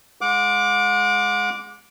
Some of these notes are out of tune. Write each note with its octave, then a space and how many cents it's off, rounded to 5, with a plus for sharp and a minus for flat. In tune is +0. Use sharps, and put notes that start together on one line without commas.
G#3 +0 F#5 -40 D6 +0